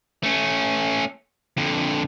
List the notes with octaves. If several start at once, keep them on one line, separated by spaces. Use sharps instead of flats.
A3 C#4
F2 D3